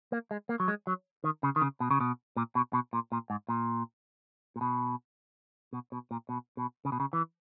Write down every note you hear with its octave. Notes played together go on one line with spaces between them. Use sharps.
A#3
G#3
A#3
F#3
G#3
F#3
D#3
C#3
D#3
C#3
B2
C#3
B2
A#2
B2
B2
A#2
A#2
G#2
A#2
A#2
B2
B2
B2
A#2
B2
B2
C#3
B2
C#3
E3